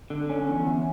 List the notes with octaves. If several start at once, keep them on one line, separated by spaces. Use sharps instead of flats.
D3
C#4
E2
E2